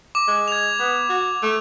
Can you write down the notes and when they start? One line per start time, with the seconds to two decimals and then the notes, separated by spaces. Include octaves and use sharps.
0.15 D6
0.28 G#3
0.48 G#6 F7
0.79 B3
1.09 F#4
1.43 A3